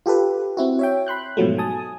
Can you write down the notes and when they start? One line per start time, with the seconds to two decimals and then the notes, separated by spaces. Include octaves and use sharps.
0.06 F4 G4 A4 B4
0.57 C4 E4 F#4
0.79 C#5 E5 G5
1.07 B5 C6 F#6 G6
1.37 G#2 B2 F3 F#3 A3
1.58 G#5 A5 D#6